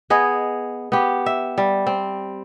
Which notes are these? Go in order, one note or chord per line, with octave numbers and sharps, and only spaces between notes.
B3 G#4 D#5
B3 G4
E5
G3
C4